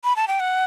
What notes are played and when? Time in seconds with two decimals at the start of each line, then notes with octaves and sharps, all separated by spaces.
0.04 B5
0.16 A5
0.28 G5
0.40 F#5